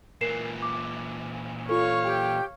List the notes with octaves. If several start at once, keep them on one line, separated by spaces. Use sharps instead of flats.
A#2 E3 A#4 C7 E7
D6
F4 A4 C#5 F5 C#6
G4 G5